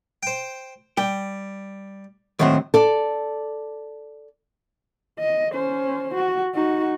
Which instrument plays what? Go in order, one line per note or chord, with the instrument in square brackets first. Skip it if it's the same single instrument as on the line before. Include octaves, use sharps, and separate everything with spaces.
[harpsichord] C5 G5
[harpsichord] G3 [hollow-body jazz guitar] G5
[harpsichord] A2 [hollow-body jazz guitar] D#3 F#3 C4
[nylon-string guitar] A4 D5
[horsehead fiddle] D#5
C#4 C5
F#4
D#4 F#4